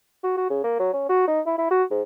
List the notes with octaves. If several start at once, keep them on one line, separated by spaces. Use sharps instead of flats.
F#4
F#4
C#3
A#3
F#3
C#4
F#4
D#4
E4
E4
F#4
G#2